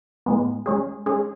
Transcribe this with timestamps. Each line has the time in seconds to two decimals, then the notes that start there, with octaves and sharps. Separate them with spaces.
0.26 A2 G#3 B3
0.66 G#3 C#4 G#4
1.06 G#3 C#4 G#4